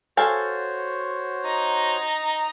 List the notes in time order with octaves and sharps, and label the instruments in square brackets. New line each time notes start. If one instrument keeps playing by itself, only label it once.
[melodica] F#4 C5 C#5 [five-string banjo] A4 F5 G#5
[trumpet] D#4 [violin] A#5